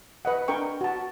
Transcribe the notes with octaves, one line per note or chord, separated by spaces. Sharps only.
B4 D#5 F#5
D4 A#4 G5 C#6
F#4 A5